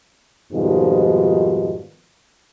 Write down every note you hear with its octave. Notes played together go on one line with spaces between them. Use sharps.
F2 G#2 B2 D#3 F3 G3